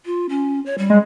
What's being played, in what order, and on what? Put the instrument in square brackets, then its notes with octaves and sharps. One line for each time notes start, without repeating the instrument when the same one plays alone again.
[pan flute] F4
C#4
C#5
G3
[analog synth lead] G#3